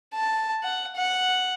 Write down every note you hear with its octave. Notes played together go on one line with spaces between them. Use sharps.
A5
F#5
F#5